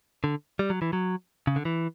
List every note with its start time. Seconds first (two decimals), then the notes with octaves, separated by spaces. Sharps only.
0.24 D3
0.59 G3
0.70 F#3
0.82 E3
0.93 F#3
1.47 C#3
1.56 D3
1.65 E3